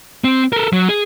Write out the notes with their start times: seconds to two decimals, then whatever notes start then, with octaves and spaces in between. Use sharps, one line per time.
0.24 C4
0.53 A4 A#4
0.73 F#3
0.89 G#4